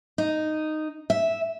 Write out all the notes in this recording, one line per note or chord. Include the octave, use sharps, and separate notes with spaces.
D#4
E5